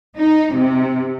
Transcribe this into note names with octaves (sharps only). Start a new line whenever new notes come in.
D#4
C3